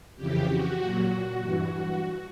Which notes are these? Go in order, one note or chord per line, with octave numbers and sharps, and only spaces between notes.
F2 C#3 E3 G4
F#4
A#2 F#3
F#4
G2 E3 F#4